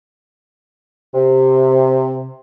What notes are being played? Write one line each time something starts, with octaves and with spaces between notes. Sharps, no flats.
C3